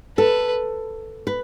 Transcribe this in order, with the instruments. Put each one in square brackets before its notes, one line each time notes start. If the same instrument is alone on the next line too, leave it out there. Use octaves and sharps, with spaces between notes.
[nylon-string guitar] A4 [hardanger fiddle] B4
[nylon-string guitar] B4